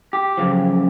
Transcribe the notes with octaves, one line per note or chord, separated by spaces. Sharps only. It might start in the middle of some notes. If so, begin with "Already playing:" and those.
G4
F#2 C#3 F3